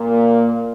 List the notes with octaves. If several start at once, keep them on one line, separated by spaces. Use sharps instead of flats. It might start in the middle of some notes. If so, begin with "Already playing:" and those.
Already playing: A#2 A#3